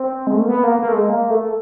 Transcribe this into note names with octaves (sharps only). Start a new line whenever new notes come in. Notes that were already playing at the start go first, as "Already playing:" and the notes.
Already playing: C4
G#3
A3
A#3
B3
A#3
A#3
A3
G#3
A#3
A3